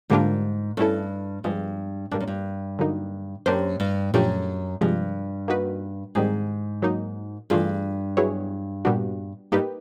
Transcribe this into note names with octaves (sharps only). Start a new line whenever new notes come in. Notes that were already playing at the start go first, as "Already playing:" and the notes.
G#2 D3 G3 A#3 D4 F4
G2 A3 C#4 E4 A4
G2 F3 G#3 B3
G2 G3 A#3 D4
F#2
G2
D3 F#3 A#3 D#4
F#2 A#3 D4 G4 C5
G2
F#2 A#2 F3 A3 D4 G4
G2 C3 F3 G#3
A#3 D#4 F#4 B4
G#2 D#3 G3 C4 D#4 G#4
F#3 A#3 D#4
G2 E3 A3 D4 F4 G#4
F#3 B3 E4 G#4 C#5
A#2 G3 B3 D4 F#4
G2 A#3 D#4 G4 B4